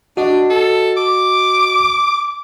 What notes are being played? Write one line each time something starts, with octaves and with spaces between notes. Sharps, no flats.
D4 F#4 D#5
A4
D6